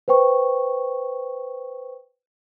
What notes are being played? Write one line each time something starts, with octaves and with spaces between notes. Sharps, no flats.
B4 C5 G5 C#6